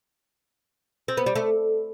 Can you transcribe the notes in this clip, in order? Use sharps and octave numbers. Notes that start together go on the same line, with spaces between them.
C4
B3
G3
A3